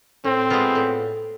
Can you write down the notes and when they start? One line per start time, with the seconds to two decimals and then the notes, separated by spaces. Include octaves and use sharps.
0.24 A2 C4
0.50 G#3 B3 F4
0.75 A2